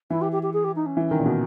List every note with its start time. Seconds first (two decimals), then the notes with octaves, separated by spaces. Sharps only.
0.10 E3 E4
0.22 G4
0.32 G4
0.43 G4
0.53 G#4
0.64 G4
0.76 D#4
0.86 C#4
0.97 E3
1.11 D#3
1.19 A#2
1.26 B2